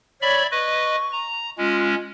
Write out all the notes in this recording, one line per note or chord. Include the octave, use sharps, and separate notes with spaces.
C#5 D5 E5 B5
B4 D#5 C#6
A#5
G#3 C#4 F4